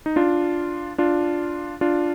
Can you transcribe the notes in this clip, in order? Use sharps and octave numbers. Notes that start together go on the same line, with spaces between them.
D#4
D4 F4
D4 F4
D4 F4